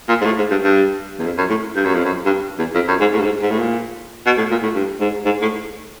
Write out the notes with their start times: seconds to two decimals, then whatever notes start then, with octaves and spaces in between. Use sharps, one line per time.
0.09 A#2
0.21 G#2
0.25 A2
0.38 G#2
0.51 G2
0.63 G2
1.19 E2
1.26 F2
1.38 F#2
1.50 A2
1.76 G2
1.85 F#2
1.95 F2
2.05 F#2
2.26 G2
2.59 E2
2.75 F2
2.88 F#2
3.01 G#2
3.13 A2
3.20 G2
3.25 G#2
3.42 G#2
3.51 A2
3.59 A#2
4.26 B2
4.38 A2
4.51 A#2
4.63 A2
4.75 G2
5.01 G#2
5.25 G#2
5.42 A2